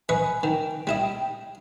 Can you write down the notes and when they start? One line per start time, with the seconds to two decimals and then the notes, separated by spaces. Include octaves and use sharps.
0.09 B4 D#5 G#5 C#6
0.43 D#3 G5
0.87 G3 E4 D#5